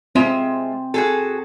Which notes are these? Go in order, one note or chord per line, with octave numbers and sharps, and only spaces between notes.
G#3 C4 F4 E5
F#4 G#4 A4